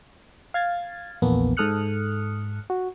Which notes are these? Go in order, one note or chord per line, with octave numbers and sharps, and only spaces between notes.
F5 G#6 A6
A#1 E2 A#3 B3
G#2 A4 D#6 F6 F#6 C#7
F#4